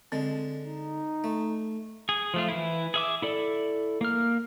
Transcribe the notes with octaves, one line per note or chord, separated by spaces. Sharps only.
D3 G#3 C4
D#4
A3
G#4
F3 A3 F4
E3 E4
G#4 E5 D6
E4 A4 D5
A#3 F6